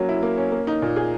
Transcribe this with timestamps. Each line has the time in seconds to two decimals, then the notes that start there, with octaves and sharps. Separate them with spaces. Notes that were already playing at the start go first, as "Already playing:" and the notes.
Already playing: F#3 A#3 C#4
0.09 E4
0.23 A#3
0.38 C#4
0.52 A#3
0.67 D#4
0.82 A#2
0.96 G#4